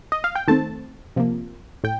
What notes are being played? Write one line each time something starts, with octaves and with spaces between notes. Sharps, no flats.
D#5
F5
G5
D#3 A3 C4 A5
C3 F3 A#3
A2 G5